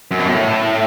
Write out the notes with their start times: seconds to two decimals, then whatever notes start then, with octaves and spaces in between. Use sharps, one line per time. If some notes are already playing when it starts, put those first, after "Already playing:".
0.11 F#2
0.19 B2
0.28 A2